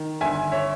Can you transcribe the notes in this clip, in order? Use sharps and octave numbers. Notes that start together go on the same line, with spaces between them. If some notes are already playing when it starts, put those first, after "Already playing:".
Already playing: D#3
G1 E5 G#5
C#5 E5